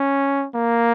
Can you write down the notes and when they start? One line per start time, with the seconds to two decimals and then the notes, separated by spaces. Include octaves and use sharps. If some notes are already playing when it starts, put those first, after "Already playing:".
Already playing: C#4
0.55 A#3